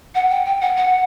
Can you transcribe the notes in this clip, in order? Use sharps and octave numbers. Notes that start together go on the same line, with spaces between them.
F#5
G5
G5
F#5
F#5